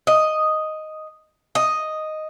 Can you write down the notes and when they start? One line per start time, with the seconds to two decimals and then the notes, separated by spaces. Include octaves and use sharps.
0.07 D#5
1.55 D#5